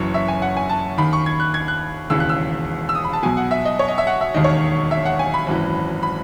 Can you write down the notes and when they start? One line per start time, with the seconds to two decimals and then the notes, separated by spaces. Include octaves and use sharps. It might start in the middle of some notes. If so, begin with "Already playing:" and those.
Already playing: F#1 F#2 E3 C#5
0.14 E5
0.28 G#5
0.42 F#5
0.57 G#5
0.69 A5
0.97 D#2 D#3 B5
1.13 C#6
1.26 G#6
1.40 F#6
1.54 G#6
1.68 F#6
2.10 E1 D#2 C#3 E3 E6
2.20 F#6
2.29 E6
2.89 E6
2.95 D#6
3.04 B5
3.13 A5
3.23 B1 B2 G#5
3.37 F#5
3.51 E5
3.65 D#5
3.79 C#5
3.88 D#5
3.98 E5
4.07 F#5
4.21 E5
4.34 E1 D#2 D#3 D#5
4.44 C#5
4.91 E5
5.05 F#5
5.19 G#5
5.34 B5
5.47 G#1 F#2 E3
6.03 B5